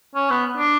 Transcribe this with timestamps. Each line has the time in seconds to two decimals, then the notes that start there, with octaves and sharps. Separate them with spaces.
0.15 C#4
0.30 B3
0.57 D4